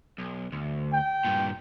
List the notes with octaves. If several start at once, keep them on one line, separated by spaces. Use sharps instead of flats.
B1
D2
G5
G2 A#2